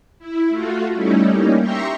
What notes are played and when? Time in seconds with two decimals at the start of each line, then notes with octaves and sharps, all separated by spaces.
0.19 E4
0.49 A3 F4 F#4
0.93 G3 A3 C#4 D#4 E4
1.27 G3 A#3 C#4 D#4
1.59 G4 E5 A#5 C6 C#6